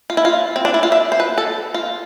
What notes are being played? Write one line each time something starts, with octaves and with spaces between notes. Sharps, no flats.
F4
E4
F4
C4
D4
E4
F4
E5
C5
B4
A4
F4